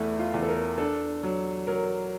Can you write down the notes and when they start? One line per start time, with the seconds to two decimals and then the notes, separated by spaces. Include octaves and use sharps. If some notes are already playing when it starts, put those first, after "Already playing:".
Already playing: E2 A3 E4
0.19 F4
0.34 E2
0.43 A4
0.49 A#4
0.78 D4 A4
1.23 F#3
1.67 F#3 A#4